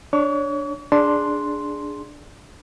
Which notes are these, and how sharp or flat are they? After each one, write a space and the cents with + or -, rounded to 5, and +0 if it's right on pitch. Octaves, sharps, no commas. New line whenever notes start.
D4 +0 C#5 +0 C#6 +45
D4 +0 G#4 +0 C6 +0